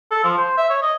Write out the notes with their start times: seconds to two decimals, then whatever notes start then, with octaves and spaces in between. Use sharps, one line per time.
0.11 A4
0.24 F3
0.37 C5
0.57 E5
0.70 C#5
0.82 D#5